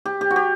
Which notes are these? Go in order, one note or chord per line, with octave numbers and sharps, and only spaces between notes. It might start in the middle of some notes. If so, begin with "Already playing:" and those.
G4
G4
F#4
G4